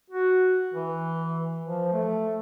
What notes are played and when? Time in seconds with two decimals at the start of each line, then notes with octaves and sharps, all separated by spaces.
0.10 F#4
0.74 E3
1.64 F3
1.93 A3